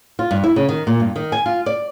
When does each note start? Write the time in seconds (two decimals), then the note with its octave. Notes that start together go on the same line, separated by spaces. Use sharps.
0.19 F4
0.31 G2
0.44 E4
0.56 C#3
0.69 D#3
0.87 A#2
1.00 G2
1.16 D#3
1.32 G#5
1.46 F4
1.66 D5